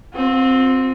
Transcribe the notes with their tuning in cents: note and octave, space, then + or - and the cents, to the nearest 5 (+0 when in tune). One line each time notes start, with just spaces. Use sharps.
C4 +0 F4 +45